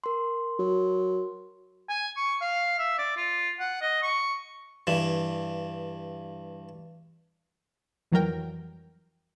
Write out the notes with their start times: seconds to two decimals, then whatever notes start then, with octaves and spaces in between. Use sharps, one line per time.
0.04 A#4 C6
0.59 F#3
1.89 G#5
2.17 C#6
2.41 F5
2.79 E5
2.98 D5
3.17 F4
3.60 F#5
3.81 D#5
4.02 C#6
4.87 G2 E3
8.12 F2 E3 F#3 G3 A#4 G5